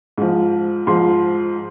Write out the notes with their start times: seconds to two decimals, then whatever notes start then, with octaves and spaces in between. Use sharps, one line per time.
0.18 G#2 F3
0.87 G#2 F3 C6